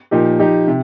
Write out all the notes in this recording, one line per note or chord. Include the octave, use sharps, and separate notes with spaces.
A#2 F3 D#4 G4
F3 D#4 G4
C3